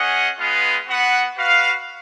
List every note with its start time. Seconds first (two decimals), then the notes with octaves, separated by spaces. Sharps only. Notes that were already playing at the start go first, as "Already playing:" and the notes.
Already playing: C#4 G#4 D#5 F#5
0.39 G#3 B3 F4 B4 F5
0.87 B3 F#4 B4 F#5
1.36 F#4 B4 F5